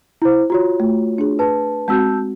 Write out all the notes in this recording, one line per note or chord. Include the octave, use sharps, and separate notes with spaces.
E4 C5
F4 F#4 C#5
A3
D4 G#4
B4 A5
G#3 C4 F#4 A5 E6 G6